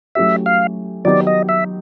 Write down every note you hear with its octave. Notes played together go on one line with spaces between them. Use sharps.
F#3 A3 C#4 E4 G4 E5
F5
D#3 F#3 B3 D#4 G4 D5
D#5
E5